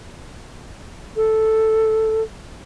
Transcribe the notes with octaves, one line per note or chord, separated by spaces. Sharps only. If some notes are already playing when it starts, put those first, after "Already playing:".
A4